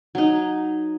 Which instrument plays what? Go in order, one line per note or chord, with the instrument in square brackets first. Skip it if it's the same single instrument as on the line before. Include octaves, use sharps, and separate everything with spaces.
[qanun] F#3 D#4